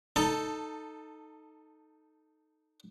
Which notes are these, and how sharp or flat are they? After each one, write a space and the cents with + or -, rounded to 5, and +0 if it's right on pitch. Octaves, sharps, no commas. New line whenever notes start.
D#4 +0 A4 +0 A5 +20